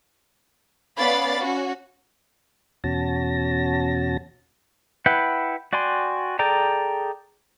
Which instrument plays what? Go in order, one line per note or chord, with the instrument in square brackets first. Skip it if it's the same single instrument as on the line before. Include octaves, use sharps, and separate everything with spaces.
[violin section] B3 C#4 D5 F5 B5 A6
C#4 F#4
[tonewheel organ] E2 B2 C#4 F#4 A5 A#6
[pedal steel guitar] E4 B4 F#5 G5
F#4 D5 G5 G#5 C6
G#4 A4 D5 G5 A#5